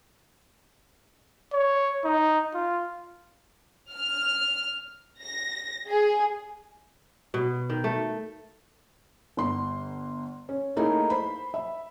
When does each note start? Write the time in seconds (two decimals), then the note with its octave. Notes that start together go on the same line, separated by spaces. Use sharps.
1.53 C#5
2.04 D#4
2.54 F4
3.93 F6
5.24 A#6
5.88 G#4
7.34 B2
7.70 D#3
7.84 A3
9.37 G1 C6
10.49 C#4
10.76 A3 A#3 D#4 E4 G#4
11.10 C5 B5
11.54 E5 B5